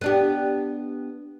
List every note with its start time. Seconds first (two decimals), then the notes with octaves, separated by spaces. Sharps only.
0.01 B3 D4 G4